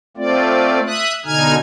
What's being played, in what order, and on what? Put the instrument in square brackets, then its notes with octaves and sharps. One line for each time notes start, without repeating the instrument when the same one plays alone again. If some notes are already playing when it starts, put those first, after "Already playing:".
[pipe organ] A3 C4 F4 D5
E5 D#6 F#6
B2 D3 D#4 G#5 F6 G#6